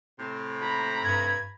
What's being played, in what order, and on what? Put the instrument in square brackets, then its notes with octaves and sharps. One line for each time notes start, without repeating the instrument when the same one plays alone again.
[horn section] A2 C3
[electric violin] A#5 B5
[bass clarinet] G2 [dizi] G#6